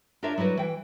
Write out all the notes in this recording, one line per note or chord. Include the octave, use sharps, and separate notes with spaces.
D4 F4 G4 A#4 C#5 E5
F#3 G3 E4 F#4 B4
E3 G5